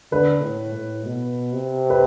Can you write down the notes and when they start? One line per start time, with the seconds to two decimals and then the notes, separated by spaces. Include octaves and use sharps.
0.12 D3 B4
0.42 A2
0.74 A2
1.05 B2
1.53 C3
1.90 B4